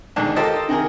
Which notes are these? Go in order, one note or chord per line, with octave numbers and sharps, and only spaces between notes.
E2 G#2 D3 D#3 D4
F4 G4 A4 A#4 C5 D#5
C3 D#3 G#4 A#4